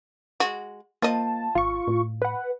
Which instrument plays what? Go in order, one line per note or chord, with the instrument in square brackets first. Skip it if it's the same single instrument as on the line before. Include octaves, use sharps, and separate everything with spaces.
[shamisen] G#3 F#4
[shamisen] F3 D#5 [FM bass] A#3 [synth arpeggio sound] A5
[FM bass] G#1 [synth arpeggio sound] F4 C#6
[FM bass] A2
[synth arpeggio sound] B4 F#5